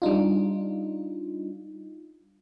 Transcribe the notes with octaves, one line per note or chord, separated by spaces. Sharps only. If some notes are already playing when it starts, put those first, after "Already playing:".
G3 D4 D#4 F4